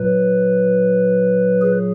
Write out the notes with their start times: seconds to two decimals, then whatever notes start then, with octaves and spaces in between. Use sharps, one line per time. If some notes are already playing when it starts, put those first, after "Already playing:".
Already playing: A#2 F#3 B4
1.62 G#4